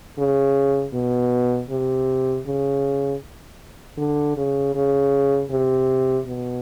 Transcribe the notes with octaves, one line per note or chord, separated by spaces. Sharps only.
C#3
B2
C3
C#3
D3
C#3
C#3
C3
B2